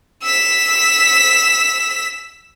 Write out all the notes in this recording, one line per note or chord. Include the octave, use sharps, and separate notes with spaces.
E6 B6